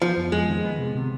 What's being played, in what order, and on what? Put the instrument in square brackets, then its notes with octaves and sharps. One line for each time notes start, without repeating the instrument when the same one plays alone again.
[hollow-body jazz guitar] F3 [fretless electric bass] B3
[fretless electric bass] F2
[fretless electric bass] F2 [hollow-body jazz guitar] G#3
[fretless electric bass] D#3
B3
C3
C3